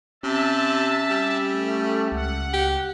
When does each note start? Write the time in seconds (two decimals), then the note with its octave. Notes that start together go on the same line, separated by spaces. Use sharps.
0.23 C3 C#4 E5 A5
1.10 G3
1.50 A3
2.12 C#2 F#5
2.53 G4